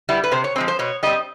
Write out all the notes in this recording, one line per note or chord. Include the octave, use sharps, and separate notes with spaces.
G3 B3 E4
B4
C3 C5
C#5
F3 G#3 C4
C5
B2 C#5
G3 C4 D#5